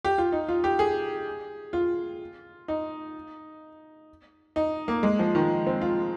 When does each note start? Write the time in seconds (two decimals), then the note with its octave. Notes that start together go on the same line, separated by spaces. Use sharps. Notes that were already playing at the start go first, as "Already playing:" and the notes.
0.05 G4
0.18 F4
0.32 D#4
0.49 F4
0.64 G4
0.79 G#4
1.73 F4
2.68 D#4
4.56 D#4
4.88 A#3
5.03 G#3
5.19 F3
5.35 D#3
5.67 C4
5.81 F4